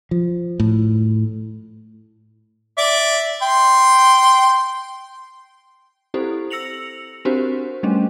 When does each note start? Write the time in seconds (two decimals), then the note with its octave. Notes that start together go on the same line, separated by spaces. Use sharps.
0.11 F3
0.60 A2
2.78 D5 E5
3.42 G5 C6
6.14 C4 E4 G4 A4 C5
6.50 E6 A#6 C#7 F7 F#7
7.25 C4 D4 F#4 G4 A#4 C5
7.83 G3 A3 C#4 D4